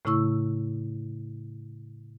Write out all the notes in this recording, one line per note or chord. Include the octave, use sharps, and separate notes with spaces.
A2 C#3 A3 E4 C#6 E6